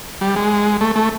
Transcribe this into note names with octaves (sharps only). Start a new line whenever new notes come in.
G3
G#3
A3
A3